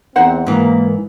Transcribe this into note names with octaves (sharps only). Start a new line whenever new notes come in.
E2 C4 D#4 C5 F#5
G#2 E3 A#3